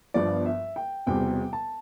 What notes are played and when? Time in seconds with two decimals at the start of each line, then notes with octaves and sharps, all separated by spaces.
0.14 G1 G2 F3 B3 D5
0.46 E5
0.76 G5
1.06 E1 E2 C3 G3 C4 G5
1.53 A5